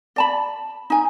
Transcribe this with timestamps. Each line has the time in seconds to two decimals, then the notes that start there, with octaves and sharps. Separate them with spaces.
0.16 D5 A5 B5
0.90 D#4 G#5